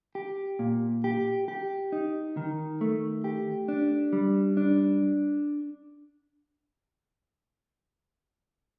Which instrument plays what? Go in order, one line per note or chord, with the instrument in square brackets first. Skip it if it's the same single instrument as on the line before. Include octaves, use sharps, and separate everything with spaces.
[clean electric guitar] G4
A#2
G4
G4
D#4
D#3
A3
G4
D4
G3
D4